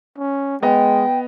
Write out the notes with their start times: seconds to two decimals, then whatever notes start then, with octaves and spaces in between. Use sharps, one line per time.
0.18 C#4
0.63 G#3 B3 D#5 G5